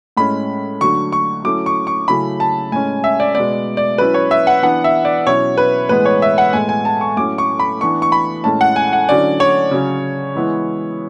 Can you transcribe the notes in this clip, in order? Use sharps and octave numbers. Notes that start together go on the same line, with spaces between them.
A2 G#3 C#4 B5
D3 F#3 A3 C#6
C#6
F#3 A3 C#4 E4 D6
C#6
C#6
C#3 F#3 A3 C#4 E4 B5
A5
A2 G#3 C#4 G#5
E5
D5
B2 G#3 B3 D5
D5
F#3 C#4 E4 B4
C#5
E5
F#5
E3 B3 D4 F#5
E5
D5
B2 F#3 C#4 E4 C#5
B4
A2 E3 G#3 B3 B4
C#5
E5
F#5
A2 G#3 B3 G#5
G#5
A5
C#6
A2 F#3 C#4 E4 D6
C#6
B5
E3 B3 D4 C#6
C#6
B5
A2 G#3 C#4 E4 A5
F#5
G#5
F#5
D3 F#3 C#4 E4 D5
C#5
C#3 F#3 C#4
E3 G#3 B3 E4